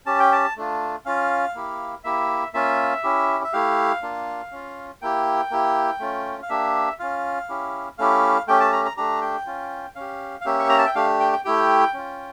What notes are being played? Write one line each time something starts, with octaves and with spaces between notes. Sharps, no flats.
C#4 G4 A5
G5
A5
A3 D4 F4
C#4 F4 F5
A#3 E4 G4
A#3 E4 G4 E5
A#3 C#4 F4 E5
C#4 E4 G4
E5
A3 E4 G4 F5
A#3 D4 F4
C#4 F4
A#3 E4 G4 G5
A#3 E4 G4
A3 C#4 F4
F5
A#3 D4 G4 E5
C#4 F4 F5
C#4 E4 G4
A3 C#4 E4 G4 F5
A3 C#4 G4 G5
A5
A#5
A#5
A3 D4 G4 A#5
G5
C#4 F4
C#4 G4 F5
F5
A#3 C#4 G4 E5
C#6
A#5
A5
G5
A3 D4 G4 F5
G5
G5
A3 E4 G4 G5
C#4 F4